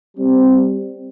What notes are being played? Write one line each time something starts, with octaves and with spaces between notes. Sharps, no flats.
G3 C4